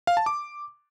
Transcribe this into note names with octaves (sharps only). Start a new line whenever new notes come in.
F5
A5
D6